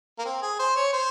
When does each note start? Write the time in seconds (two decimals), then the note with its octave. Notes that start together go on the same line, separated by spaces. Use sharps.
0.19 A#3
0.25 C4
0.42 G#4
0.59 C5
0.76 C#5
0.93 C5